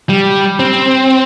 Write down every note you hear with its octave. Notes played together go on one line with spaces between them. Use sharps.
G3
C4